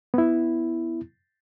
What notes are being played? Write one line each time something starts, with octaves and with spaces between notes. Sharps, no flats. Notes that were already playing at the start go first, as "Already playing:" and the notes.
B3 E4